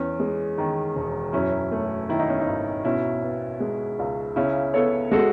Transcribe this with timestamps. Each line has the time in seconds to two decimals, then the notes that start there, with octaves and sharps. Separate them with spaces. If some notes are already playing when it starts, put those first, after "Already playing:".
Already playing: E2 C#4
0.20 G#3
0.58 D#3
0.96 E1
1.33 F#2 C#4 E4
1.72 A3
2.09 D#3 E4
2.19 D#4
2.30 C#4
2.40 D#4
2.47 G#1
2.85 B2 C#4 E4
3.23 B3
3.60 G#3
3.99 C#2
4.36 C#3 C#4 E4
4.74 B3 A4 C#5
5.11 G#3 F#4 A4